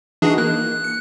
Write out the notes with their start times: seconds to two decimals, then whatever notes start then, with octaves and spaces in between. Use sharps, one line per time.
0.22 E3 D4 D#4 F#4 G#4
0.38 A#3 F#6
0.84 C#7